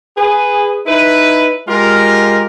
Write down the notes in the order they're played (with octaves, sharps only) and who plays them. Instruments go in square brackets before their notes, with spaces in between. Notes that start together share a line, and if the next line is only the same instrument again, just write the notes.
[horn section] G#4 B4
D#4 E4 B4
G#3 F4 G4 A#4